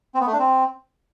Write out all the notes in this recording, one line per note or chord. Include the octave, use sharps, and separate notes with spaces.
C4
B3
A3
D4
C4